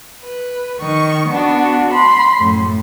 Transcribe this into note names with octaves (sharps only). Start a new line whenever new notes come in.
B4
D#3 C#6
B3 D4 F#4
B5 C6
F#2 A2